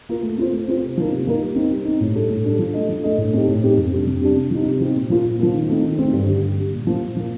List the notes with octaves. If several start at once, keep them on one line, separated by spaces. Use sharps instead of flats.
A#3 F4 A#4
A3
C4 F4 C5
A3
C4 F4 C5
C3
F3 A#3 D#4 A#4
C3
F3 A#3 D#4 A#4
G3
C4 D#4
G3
C4 D#4
A2
G3 D4 A4
A2
G3 D4 A4
F3
A3 D4 A4 D#5
F3
A3 D4 A4 D#5
A2
A3 C4 D#4 G4
A2
A3 C4 D#4 G4
F2
C3 G3 D4
F2
C3 G3 D4
C3
F3 C4 D#4
C3
F3 C4 D#4
A#2
F3 A#3 F4
A#2
F3 A#3 F4
D#3
A3 C4 D#4
D#3
A3 C4 D#4
G2
D3 G3
G2
D3 G3
A#2
F3 A#3
A#2
F3 A#3